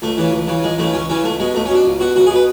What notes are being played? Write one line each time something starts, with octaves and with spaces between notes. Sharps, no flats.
C#2 A3
C#3 E3
C#2
C#3 E3
C#2 G#3
C#3 E3 A3
C#2 C#4
C#3 E3 C#4
C#2 A3
B2 G#3
C#2 A3
C#4
B2
D4
C#2
B2 F#4
C#2 F#4
G#4
B2
B4